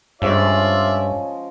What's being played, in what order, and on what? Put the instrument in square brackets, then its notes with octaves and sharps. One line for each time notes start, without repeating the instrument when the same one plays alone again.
[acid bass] G2 [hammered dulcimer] F3 G#3 C#4 [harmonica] F4 D5 E5 [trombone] C#5